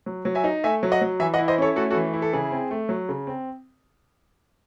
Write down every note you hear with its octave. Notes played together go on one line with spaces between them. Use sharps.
F#3
F#3
E5 G#5
D#4
A3 E5 G#5
F#3
D#5 F#5
F#3
E3 E5 G#5
D#5 F#5
E4
C5 D#5
C#4 A4 C#5
A3 F#4 A4
F#4 A4
E3
E4
A4
C#3 G#4
C4
A3
F#3
C#3
C4